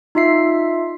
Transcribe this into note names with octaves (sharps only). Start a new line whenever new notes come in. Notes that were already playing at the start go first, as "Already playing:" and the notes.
D#4 F4 E5 C7